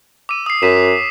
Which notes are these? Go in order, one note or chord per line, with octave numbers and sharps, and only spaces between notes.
D6 E6 D#7
D#6 C7
F#2 B6 D#7 E7